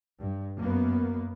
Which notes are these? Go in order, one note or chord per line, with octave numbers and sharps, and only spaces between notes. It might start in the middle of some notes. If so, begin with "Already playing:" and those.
G2
F#2 A#3 B3